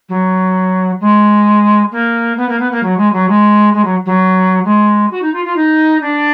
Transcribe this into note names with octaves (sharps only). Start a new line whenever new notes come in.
F#3
G#3
A#3
B3
A#3
B3
A#3
F#3
G#3
F#3
G#3
G#3
F#3
F#3
G#3
F#4
D#4
F4
F4
D#4
D4